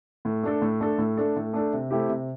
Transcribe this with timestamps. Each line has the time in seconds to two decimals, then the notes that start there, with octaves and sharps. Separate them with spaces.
0.25 A2
0.43 A3 D4 A4
0.62 A2
0.81 A3 D4 A4
0.98 A2
1.17 A3 D4 A4
1.36 A2
1.53 A3 D4 A4
1.73 C3
1.90 A3 C4 E4 G4
2.09 C3